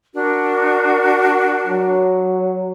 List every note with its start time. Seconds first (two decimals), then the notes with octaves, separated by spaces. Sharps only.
0.14 D4 F#4 A#4
1.67 F#3